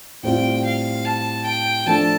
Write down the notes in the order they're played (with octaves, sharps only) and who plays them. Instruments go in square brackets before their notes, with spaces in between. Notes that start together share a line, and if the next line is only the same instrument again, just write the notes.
[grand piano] A2 G3 C4 F4 [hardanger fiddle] G5
[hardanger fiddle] F5
A5
G5
[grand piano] F3 A3 D4 A4 [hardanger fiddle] A5